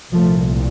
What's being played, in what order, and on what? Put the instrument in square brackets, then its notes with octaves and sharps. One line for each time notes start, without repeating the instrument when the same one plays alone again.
[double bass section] C2 A#2 F3 A3